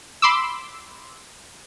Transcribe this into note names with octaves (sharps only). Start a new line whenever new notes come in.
B5 C6 D6 E6